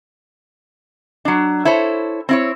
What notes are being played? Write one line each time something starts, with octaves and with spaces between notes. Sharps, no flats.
F#3 D4
E4 A4 C5 C#5
C4 E4 C#5